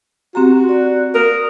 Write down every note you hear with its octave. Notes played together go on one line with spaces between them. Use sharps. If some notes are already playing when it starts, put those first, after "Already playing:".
C4 F#4 G4 A#5
D5
A#4 D#6